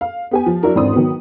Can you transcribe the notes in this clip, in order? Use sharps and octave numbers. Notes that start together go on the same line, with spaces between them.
F5
B3 G4 G#5
F3
F#3 D4 E4 F#4 A#4
G#1 E2 C4 D4 C6 D#6
D#3 F#3 B3